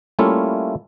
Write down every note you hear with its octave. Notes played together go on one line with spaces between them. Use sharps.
G3 A3 A#3 C#4 E4 F4